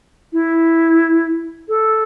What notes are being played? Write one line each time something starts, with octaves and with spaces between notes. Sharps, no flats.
E4
A4